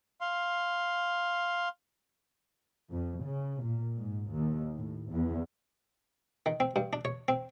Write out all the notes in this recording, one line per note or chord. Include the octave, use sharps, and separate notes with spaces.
F5 C6
F2
C#3
A#2
G#2
D#2
A2
E2
D#3
C4
G2
D4
C#5
C4